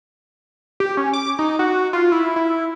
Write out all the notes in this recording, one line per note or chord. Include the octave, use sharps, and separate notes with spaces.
G4
C#4
D6
D#4
F#4
F4
E4
E4